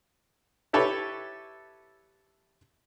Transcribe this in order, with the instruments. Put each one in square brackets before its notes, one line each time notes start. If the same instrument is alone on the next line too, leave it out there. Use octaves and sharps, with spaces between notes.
[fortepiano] E4 G4 A4 B4 C#5